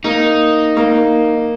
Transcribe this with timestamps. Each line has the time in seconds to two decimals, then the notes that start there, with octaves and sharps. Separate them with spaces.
0.04 A#3 D#4
0.77 A#3